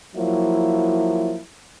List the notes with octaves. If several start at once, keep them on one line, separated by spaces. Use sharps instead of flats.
F3 F#3 A#3 E4